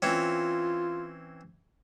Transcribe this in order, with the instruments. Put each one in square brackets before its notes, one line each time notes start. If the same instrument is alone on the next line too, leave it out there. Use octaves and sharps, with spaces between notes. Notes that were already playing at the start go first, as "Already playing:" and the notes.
[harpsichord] E3 C4 C#4 [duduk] F4